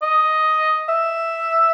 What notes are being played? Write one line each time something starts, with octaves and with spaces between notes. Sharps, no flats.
D#5
E5